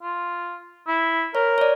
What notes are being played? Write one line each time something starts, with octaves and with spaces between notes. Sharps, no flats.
F4
E4
A#4 C#5
C#5 D5